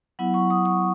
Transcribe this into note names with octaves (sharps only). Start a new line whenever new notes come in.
F#3 B3 E4 F#5
C#6
D#6
C#6